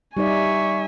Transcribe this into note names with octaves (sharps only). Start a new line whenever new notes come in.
G3 D#4 D5 E5 G#5 C#6